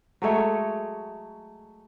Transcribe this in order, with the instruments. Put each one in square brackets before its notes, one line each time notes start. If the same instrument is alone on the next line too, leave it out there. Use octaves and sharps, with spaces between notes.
[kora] F#3 G#3 A3 C#5